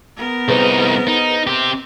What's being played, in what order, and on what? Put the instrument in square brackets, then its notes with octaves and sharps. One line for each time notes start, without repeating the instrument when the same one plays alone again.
[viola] B3 A#4
[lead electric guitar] C2 D#4 [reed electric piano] G#4 B4 C5
[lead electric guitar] D#4
C4 G4